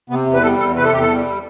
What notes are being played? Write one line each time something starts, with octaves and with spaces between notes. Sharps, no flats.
C3 B3
E2
B4
G3 A4
E2 A4
C3 B4
A4
E2 G4
A4
G3